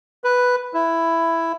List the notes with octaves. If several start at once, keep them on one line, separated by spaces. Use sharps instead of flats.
B4
E4